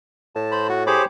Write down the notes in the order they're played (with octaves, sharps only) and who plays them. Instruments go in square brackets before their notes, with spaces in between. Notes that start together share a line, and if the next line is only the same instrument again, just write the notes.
[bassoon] A2 [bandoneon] A5
[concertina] C5 B5
F#4
[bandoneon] G4 C5 C#5 [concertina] G#4 B5 D6